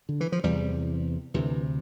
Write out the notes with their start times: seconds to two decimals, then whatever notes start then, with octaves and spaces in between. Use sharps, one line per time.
0.09 D3
0.21 E3
0.32 F3
0.44 E2 C3 G3
1.34 D2 C3 E3